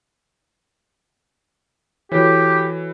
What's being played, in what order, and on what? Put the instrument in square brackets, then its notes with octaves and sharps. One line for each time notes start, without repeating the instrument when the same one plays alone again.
[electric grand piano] E3 [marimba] F#4 A4 C#5 [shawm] G4